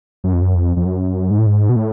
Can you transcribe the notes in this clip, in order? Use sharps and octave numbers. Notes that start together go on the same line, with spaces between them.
F#2
F2
F#2
F2
F2
F#2
G#2
A2
G#2
B2
A2